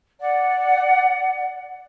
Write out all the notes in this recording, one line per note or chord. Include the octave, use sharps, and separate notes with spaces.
D5 F#5